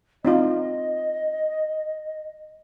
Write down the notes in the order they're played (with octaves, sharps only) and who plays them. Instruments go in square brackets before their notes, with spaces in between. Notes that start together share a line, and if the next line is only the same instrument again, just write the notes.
[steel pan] C4 D#4 F4 [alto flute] D#5